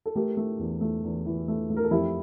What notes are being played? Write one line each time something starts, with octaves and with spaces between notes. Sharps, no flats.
A4
A3 G4 A#4
A3
E2
A3
E2
E3
A3
A3
A#4
A4
F2 E4 G4